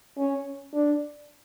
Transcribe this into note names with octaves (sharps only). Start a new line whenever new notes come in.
C#4
D4